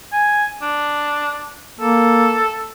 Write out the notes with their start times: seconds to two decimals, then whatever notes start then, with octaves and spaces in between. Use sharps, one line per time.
0.13 G#5
0.62 D4
1.80 A#3 A4